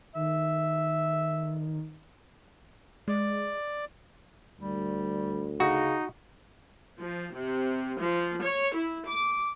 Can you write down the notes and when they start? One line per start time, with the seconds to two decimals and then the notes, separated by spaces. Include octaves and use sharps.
0.15 D#3 E5
3.08 G#3 D5
4.60 D2 G3
5.60 C#3 D#4 F#4
7.01 F3
7.35 C3
8.00 F3
8.43 C#5
8.75 E4
9.08 D6